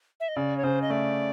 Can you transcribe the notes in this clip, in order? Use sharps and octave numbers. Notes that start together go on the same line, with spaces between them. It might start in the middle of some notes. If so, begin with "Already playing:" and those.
E5
D#5
C#3 D5
C#5
C#3 C5
D#5
A3 D5